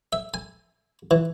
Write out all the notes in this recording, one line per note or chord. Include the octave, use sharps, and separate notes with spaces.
E5
G#5
E3